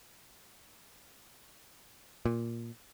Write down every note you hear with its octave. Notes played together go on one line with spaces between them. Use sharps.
A#2